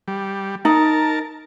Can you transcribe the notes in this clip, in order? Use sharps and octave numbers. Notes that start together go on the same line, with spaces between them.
G3
D#4 A#4 A5